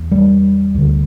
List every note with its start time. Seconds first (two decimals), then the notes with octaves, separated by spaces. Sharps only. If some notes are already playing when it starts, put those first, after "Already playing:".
Already playing: E2
0.12 G3
0.74 D2 D3